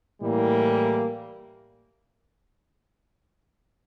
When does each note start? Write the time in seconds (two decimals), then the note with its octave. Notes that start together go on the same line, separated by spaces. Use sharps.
0.21 A2 E3 G3 A#3